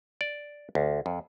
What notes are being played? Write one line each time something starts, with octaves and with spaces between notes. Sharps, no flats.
D5
D2
F2